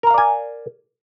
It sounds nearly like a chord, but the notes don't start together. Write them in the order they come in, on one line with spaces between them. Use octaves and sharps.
A#4 A#5 F5 D5 G#5